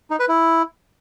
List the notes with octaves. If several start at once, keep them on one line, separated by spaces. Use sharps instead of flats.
D#4
B4
E4